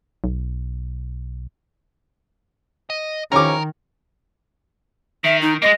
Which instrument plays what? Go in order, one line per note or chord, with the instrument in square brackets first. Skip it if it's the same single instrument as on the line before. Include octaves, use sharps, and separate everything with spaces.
[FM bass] B1
[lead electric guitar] D#5
[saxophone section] E2 F3 C#4 [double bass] D#3 [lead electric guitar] A#4 [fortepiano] A#5 D6
[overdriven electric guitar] D#3 [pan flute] E5
[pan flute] D#4
[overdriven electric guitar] G#3 A#3 [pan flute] D#5